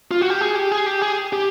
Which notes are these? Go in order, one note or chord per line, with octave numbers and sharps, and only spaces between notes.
F4
F#4
G4
G#4
G4
G#4
G4
G#4
G4